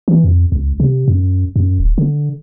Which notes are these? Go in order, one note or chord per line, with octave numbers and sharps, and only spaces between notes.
E3
F2
C#2
C3
F#2
F#2
D1
D3